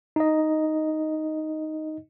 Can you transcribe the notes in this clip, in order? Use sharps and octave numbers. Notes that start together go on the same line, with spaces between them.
D#4 D#5